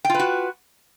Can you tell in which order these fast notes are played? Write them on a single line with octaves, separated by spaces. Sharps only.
G5 F4 B4 F#4